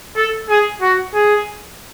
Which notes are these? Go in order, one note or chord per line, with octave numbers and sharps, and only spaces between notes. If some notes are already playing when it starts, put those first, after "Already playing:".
A4
G#4
F#4
G#4